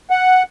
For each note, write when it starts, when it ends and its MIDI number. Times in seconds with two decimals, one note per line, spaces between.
0.10 0.43 78